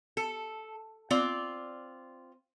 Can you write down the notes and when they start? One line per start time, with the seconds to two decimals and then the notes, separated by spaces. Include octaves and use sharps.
0.17 A4
1.10 C4 F4 D5